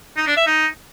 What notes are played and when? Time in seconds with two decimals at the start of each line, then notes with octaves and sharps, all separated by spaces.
0.17 D#4
0.27 D4
0.37 E5
0.47 D#4